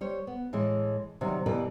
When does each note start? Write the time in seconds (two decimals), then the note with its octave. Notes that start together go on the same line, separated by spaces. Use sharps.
0.01 G3 C5 C#5
0.27 B3
0.53 A2 E3 G#3
1.21 C3 D#3 F#3 G3
1.46 B2 E3 G3 E4 A#4 B4